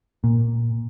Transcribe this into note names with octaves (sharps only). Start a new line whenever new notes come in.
A#2